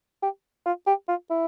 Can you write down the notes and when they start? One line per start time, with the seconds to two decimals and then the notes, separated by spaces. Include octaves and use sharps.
0.22 G4
0.65 F4
0.86 G4
1.08 F4
1.30 E4